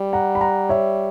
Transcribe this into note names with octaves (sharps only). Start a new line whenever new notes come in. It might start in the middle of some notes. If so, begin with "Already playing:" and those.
Already playing: G3
F#5 A#5
B5
F#5 A#5
C#5 E5